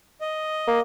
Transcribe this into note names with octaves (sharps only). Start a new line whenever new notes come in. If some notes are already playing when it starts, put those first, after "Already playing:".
D#5
A#3